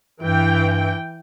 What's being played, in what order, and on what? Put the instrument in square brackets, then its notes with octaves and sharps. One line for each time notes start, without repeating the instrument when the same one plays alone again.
[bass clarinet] G2 [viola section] E3 G5